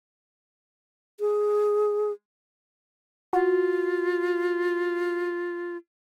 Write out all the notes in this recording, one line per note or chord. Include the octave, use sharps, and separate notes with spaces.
G#4
F4 F#4